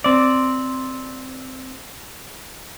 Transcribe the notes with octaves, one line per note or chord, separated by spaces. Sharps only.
C4 D5